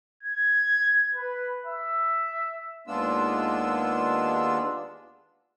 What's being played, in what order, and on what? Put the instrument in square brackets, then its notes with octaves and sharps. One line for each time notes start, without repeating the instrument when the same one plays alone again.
[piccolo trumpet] G#6
B4
E5
[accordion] D#2 G#3 B3 D4 F4 E6